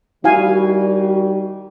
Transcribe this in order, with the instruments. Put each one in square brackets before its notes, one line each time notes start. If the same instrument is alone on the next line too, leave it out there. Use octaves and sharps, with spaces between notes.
[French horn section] D#3 G3 [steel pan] E4 F5 G#5 [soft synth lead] F#4